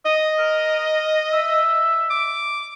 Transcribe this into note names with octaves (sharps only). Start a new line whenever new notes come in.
D#5 D#6
A#4
E5
D6